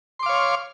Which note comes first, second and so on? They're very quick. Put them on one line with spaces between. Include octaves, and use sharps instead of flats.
C6 D6 F5 C#5